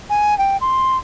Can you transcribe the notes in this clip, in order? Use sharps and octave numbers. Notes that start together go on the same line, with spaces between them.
G#5
G5
C6